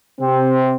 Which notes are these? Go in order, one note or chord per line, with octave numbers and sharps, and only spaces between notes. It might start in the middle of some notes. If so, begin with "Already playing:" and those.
C3 C4